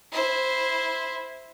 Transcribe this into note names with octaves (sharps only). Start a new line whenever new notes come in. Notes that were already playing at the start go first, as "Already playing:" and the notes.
E4 C5